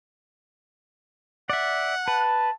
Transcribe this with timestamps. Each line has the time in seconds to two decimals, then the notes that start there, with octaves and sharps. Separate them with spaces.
1.50 D5 E5 F#5
2.08 B4 A5